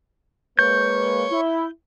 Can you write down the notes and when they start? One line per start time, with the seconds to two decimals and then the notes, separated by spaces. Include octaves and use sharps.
0.59 G#3 A#3 B4 C#5 G6
1.31 E4